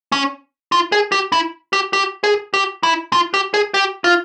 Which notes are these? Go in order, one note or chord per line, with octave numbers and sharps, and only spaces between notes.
C#4
F4
G#4
G4
E4
G4
G4
G#4
G4
E4
F4
G4
G#4
G4
F4